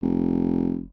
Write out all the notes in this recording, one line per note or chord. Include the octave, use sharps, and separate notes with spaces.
F1